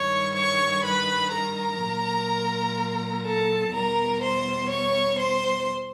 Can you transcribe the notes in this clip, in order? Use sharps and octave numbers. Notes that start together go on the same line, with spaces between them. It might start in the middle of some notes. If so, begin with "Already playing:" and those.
Already playing: G2 D#3 G3 C#5 C#6
C#5 C#6
B4 B5
A#4 A#5
A#2 F#3
A4 A5
E2 B2 G3 A#4 A#5
C5 C6
C#5 C#6
C5 C6